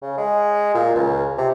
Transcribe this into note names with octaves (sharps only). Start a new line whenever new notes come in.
C#3
G#3
A#2
C#2
C3